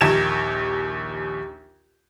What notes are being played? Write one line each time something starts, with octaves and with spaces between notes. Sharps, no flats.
A#1 D#2 G4 G#6 E7